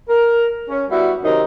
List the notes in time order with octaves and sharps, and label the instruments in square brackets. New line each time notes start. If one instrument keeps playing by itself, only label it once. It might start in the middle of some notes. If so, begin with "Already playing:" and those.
[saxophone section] A#4
C#4
G3 B3 E4 F#4
F#2 C3 D#3 D#4 A#4